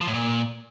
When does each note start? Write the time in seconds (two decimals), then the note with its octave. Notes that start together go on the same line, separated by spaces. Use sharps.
0.01 F3
0.07 A2
0.14 A#2